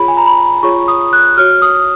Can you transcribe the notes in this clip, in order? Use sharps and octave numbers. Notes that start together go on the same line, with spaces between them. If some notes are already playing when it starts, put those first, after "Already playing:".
Already playing: F4 G#4 C#5 B5
G#5
A#5
B5
F4 G#4 C#5 C#6
D#6
F#6
F#4 C#5 F6
D#6